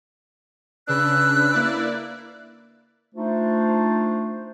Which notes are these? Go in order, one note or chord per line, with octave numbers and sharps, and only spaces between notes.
C#3 D4 B4 E6 F#6
A#3 E4 D5
A3 D4 D#4 F4 C5